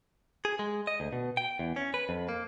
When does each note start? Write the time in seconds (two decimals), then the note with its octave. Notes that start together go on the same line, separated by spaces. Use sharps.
0.45 G#4
0.59 G#3
0.87 D#5
1.00 D2
1.13 B2
1.37 G5
1.59 E2
1.76 C#4
1.94 B4
2.09 F2
2.29 A#3